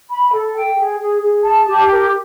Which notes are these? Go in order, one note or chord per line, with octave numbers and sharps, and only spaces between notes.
B5
A4
G5
G#4
G#4
G#4
A5
G4
A#4